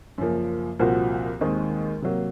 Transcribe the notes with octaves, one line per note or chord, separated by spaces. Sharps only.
F#2 C#3 F3 A#3
C2 A#2 F3 C4 F#4
D#2 D#3 G#3 C4 D#4
C3 F#3 A#3